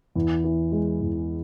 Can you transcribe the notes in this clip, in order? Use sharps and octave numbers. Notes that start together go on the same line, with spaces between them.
E2
E3
G#3
E2